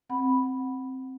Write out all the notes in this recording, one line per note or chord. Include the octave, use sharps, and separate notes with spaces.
C4 F#5 B5